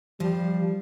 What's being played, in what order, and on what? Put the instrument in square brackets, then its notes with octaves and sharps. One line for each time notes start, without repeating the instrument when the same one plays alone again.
[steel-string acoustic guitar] F3 [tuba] G3